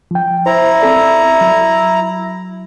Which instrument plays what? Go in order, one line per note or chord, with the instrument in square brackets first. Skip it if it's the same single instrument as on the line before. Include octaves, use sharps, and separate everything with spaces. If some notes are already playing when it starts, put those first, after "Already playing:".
[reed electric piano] F3 G5
[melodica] E4 A#5 [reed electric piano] C5
[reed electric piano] C4 A4 D5
F#3